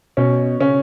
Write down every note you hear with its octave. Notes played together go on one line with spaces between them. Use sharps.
B2 C#4
C#3 C#4